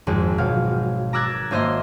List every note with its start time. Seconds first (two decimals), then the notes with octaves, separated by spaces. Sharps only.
0.07 G#1 F2 G#3
0.38 B2 F#3 F5
1.13 A#5 D6 E6 F#6 G#6 A6
1.51 G#1 A#3 C5 D#5 E5 C6